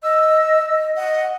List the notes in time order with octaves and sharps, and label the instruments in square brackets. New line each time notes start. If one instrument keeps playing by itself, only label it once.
[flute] D#5 [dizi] E6
[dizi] D#5 [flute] F#5